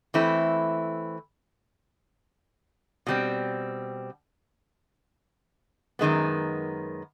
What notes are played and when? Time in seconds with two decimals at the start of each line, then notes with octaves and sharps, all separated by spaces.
0.14 E3 A3 C4 E4
3.07 B2 G3 C4
5.99 F#2 D#3 G#3 B3